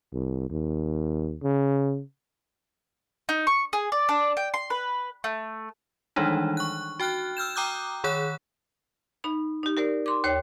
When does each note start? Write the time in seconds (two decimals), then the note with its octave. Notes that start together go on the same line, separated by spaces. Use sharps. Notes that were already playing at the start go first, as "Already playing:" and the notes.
0.13 C2
0.50 D#2
1.43 C#3
3.29 D#4
3.47 C#6
3.73 G#4
3.92 D5
4.09 D4
4.37 G5
4.54 C6
4.70 B4
5.24 A3
6.16 D#3 E3 G3 G#3 D4 D#4
6.57 C#6 F#6
7.00 F#4 G5 F6 F#6
7.37 E6 F6 G6 E7
7.56 G5 A#5 D6 D#6 F#6 G6
8.04 D#3 G#4 C#5 F#6
9.24 D#4 B5
9.63 D#4 G4
9.77 G4 A#4 C5 D5
10.06 C6 D6
10.24 D#2 C5 C#5 G5